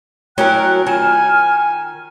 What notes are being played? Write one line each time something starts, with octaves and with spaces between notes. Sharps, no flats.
F#3 A3 C#4 E4 A#4 C#5 G5 F#6
D#3 F4 G5 G#5 F6 E7